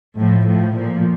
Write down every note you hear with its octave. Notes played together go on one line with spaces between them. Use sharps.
A2 F3
A2 F3
A#2 F3